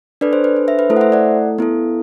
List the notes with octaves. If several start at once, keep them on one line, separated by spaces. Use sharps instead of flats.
D4 A4 B4 D5
C5
B4
C5
C5 E5
B4
A3 E4 A4 C5
F#5
C5 E5
D5 F#5
B3 E4 A4